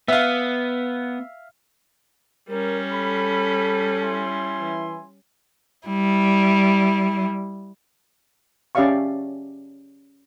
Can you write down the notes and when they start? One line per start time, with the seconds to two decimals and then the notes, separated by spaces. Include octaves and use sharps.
0.08 B3 E5 F5
2.50 G3 C#4 A#4
2.91 A4 B5
4.02 E4 G#5 C6
4.60 E3
5.87 G3 E4
8.75 C#4 G4 D5 E5 F5 C#6